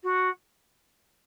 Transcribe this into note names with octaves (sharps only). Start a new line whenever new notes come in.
F#4